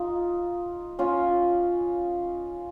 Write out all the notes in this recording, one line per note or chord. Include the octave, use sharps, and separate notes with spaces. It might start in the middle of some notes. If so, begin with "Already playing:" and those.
Already playing: D#4 F4
C#4 F4